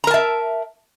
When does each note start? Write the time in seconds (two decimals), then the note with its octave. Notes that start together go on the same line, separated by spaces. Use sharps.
0.04 A#5
0.07 A#4
0.11 A5
0.14 E5